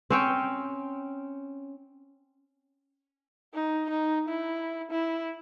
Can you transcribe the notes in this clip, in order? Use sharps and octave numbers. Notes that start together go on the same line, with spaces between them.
C4 C#4 G5
D#4
D#4
E4
E4